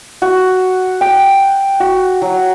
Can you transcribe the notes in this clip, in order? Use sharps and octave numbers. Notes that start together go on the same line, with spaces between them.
F#4
G5
F#4
F#3